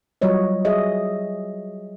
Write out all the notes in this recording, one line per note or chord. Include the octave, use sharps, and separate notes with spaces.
F#3 G3 F4 C#5 D#5
G#4 D#5 E5